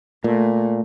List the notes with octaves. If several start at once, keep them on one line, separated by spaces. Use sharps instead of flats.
A#2 A3